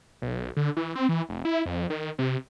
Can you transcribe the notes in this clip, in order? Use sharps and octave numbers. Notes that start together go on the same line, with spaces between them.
B1
D3
E3
C4
E3
F1
E4
F2
D#3
C3